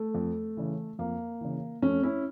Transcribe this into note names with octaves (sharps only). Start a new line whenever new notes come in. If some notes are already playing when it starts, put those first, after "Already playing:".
Already playing: A3
F2
C#3 E3
F2 A#3
C#3 E3
F2 A3 C#4
C#4 E4